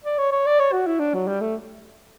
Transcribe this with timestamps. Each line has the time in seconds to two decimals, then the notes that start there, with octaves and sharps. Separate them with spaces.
0.05 D5
0.18 C#5
0.32 C#5
0.46 D5
0.60 C#5
0.72 F#4
0.87 E4
1.00 D4
1.14 F#3
1.28 G3
1.41 A3